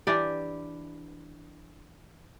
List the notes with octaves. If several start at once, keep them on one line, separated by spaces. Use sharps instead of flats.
E3 D4 G4 D5